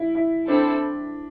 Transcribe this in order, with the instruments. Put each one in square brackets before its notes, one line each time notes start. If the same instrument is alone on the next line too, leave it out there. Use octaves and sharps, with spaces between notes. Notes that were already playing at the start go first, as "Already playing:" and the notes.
Already playing: [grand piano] E4
E4
[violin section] C4 E4 A4 C5 [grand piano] D4